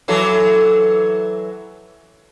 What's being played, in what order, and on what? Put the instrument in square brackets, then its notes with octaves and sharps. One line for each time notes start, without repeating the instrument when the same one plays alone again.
[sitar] E3 F#3 A4